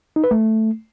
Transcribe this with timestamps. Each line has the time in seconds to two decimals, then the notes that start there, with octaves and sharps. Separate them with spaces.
0.16 D#4
0.24 B4
0.31 A3